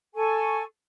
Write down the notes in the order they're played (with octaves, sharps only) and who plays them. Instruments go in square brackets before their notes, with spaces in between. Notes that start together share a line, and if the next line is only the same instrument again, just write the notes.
[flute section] A4 G#5 C#6